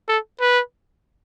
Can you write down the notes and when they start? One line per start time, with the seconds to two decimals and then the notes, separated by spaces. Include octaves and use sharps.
0.09 A4
0.41 B4